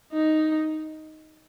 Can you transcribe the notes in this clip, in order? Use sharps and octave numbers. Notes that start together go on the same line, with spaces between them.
D#4